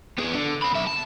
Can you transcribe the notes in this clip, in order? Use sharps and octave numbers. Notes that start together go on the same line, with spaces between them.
B3 G#4
D3
C3 B5
B1 E5
A5